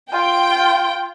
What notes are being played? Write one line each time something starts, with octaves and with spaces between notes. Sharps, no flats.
F4 G5